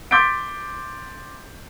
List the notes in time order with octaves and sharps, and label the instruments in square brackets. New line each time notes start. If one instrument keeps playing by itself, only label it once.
[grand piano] C6 D6 G6 A6 B6 D7